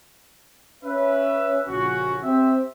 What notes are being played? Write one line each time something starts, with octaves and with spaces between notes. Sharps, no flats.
C#4 B4 E5
A#1 C#3 C#4 F#4
C4 G4 E5